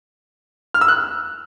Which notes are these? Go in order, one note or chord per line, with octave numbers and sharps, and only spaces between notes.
F6
E6
F#6